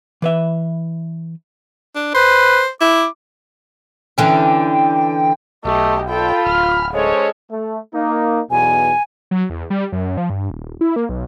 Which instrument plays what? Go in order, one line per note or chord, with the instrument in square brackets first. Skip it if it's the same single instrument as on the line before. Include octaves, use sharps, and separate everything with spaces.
[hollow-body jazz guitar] E3 B4 E5
[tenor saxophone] D4
[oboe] B4 [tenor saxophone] C5
[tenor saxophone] E4 [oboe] D6
[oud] D3 E3 C#4 [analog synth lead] G5
[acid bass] B1 [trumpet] A3 [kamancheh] G4 D#5
[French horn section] F4 [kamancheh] A4 G5 [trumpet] B5
[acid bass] D1 [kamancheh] F6
[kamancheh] G#3 A4 [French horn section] C#4 C5 C#5
[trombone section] A3
A#3 D#4
[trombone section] B1 E2 B2 [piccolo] G#5
[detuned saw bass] F#3
E2
G3
F#2
F3
G2
D#1
E4
A#3
B1